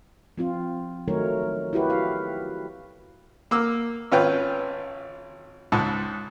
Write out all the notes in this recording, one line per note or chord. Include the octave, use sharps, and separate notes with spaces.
F3 C4 F4
D#3 F#3 A3 D#4 A#4 C#5
E4 F#4 G4 B4
F5
A#3 D6 E6 F6
G#1 C#4 F4 B4 G5 F6
C#2 G#2 A5